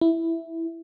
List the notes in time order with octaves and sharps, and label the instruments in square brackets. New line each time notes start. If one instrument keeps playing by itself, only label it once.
[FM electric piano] E4